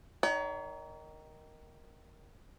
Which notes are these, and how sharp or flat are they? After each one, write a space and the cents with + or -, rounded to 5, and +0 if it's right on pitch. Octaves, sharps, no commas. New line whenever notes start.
D#3 +0 C#5 +40 F#5 +40